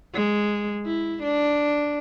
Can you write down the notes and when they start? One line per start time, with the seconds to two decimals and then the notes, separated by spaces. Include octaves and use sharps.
0.14 G#3
0.86 E4
1.23 D4